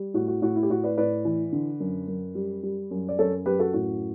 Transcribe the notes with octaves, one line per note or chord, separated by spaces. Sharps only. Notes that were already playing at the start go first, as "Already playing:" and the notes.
Already playing: G3
A2 F#4
F#4
A2 F#4
E4
G4
A2 F#4
B4 D5
A2 B4 D5
E3
D3
F#2
F#2
G3
G3
F#2
D5
F#2 A4 C#5
F#2 G4 B4
F#4 A4
A2 F#4